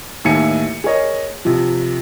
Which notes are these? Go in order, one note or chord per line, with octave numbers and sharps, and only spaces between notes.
D#2 A2 D#4 E5 G#5 C#7
G#4 A#4 C#5 D#5
C3 F3